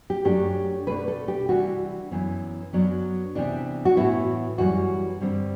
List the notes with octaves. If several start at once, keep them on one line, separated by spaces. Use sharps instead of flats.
G4
F#2 F#3 A3 D4 G4
B2 A3 D4 B4
A4
G4
C3 E3 G3 D4 F#4
F#2 E3 B3
F#2 F#3 B3 D4
C3 E3 B3 D4
F#4
A2 E3 B3 E4
F#2 E3 G3 F#4
G2 D3 G3 C4